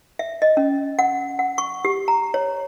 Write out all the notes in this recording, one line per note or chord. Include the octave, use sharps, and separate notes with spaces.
E5
D#5
C#4
F#5
F#5
C#6
G4
A#5
C#5